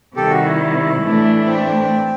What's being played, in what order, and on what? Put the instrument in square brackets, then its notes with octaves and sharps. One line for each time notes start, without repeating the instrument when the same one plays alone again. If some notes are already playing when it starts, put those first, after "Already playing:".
[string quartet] C3 D#3 G3 [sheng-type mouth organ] G4 A4
[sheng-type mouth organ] F#4
E4
[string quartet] A2 E3 A3 D4
[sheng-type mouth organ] C4